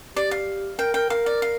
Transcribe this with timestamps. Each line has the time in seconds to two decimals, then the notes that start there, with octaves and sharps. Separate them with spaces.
0.16 G4 D5
0.31 F5
0.79 A#4 G5
0.94 A#4 G5
1.10 A#4 F5
1.26 D5
1.42 F5